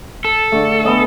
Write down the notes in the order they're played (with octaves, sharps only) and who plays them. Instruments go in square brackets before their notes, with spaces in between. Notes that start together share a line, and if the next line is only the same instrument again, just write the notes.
[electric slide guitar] A4
[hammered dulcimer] D3 A3
B3 D#5 G#5